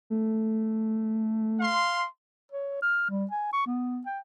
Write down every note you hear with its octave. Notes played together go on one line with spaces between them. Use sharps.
A3
F5 C6
C#5
F6
G3
G#5
C#6
B3
G5